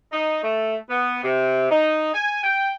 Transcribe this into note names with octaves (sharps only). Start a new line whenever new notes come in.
D#4
A3
B3
C3
D#4
G#5
G5